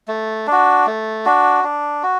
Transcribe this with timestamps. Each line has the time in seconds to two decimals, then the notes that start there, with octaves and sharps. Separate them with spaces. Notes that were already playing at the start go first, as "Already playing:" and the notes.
0.08 A3
0.47 D4 F#4
0.87 A3
1.25 D4 F#4
1.64 D4
2.03 F#4